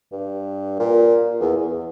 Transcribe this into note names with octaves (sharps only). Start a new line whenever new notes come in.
G2
A#2
E2
E2